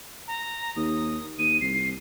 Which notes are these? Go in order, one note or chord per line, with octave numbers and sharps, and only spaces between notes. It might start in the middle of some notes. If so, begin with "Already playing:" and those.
A#5
D#2 D#6
D#2 D#7
C2 C7